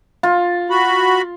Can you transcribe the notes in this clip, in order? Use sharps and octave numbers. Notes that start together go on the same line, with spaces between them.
F4
F#4 B5